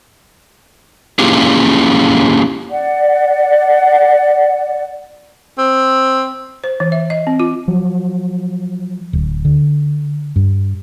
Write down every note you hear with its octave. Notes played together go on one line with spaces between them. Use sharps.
A#3 C#4 E4 F4 G4 G#4
D5 F#5
C4
C5
E3
E5
D#5
C4
F4
F3 F#3
D1
D3
G2